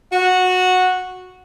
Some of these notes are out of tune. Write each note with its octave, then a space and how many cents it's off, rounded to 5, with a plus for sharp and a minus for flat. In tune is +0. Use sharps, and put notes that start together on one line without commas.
F#4 -10